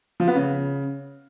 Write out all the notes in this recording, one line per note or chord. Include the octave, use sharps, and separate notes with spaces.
F3
B3
C#3